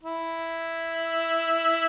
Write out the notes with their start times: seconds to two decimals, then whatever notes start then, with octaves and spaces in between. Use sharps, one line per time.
0.04 E4